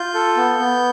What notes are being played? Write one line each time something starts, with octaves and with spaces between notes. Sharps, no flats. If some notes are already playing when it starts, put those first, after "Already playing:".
Already playing: F4 G6
A4
B3
B3